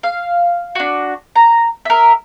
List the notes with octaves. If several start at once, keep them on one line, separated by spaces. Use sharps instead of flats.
F5
D4 F#4
A#5
A#4 E5